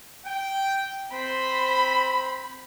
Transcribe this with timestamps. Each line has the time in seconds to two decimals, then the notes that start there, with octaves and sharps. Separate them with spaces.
0.25 G5
1.12 C4 C5 B5